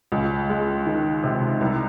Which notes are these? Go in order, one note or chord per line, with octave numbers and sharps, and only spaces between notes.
C#2
G#3
D#3
C3
C2